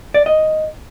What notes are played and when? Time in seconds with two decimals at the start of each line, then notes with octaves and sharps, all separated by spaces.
0.14 D5
0.26 D#5